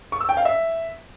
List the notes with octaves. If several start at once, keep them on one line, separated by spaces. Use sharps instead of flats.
C#6
E6
G5
F5
E5